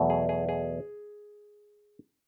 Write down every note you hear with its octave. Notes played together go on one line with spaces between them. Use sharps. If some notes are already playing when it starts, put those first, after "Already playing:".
Already playing: E2 B2 F#3 A3
G#4
G#4
G#4